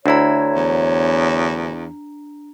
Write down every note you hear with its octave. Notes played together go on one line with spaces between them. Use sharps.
D2 D4 E4 C#5 A#5
E2